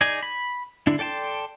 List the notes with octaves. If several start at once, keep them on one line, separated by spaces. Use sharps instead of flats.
D#4 G#4 D5 G#5
B5
D3 D4 E4
A4 D5 G5 A5 C6